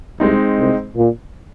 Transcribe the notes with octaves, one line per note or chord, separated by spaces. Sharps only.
C2 C3 G#3 C4 D#4
C2 C3
A#2